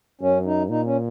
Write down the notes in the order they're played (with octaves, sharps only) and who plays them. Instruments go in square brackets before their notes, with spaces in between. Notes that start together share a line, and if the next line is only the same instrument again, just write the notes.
[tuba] F#2 [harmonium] C#4
[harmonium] D#4
[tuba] A#2 [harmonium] D#4
[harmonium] C#4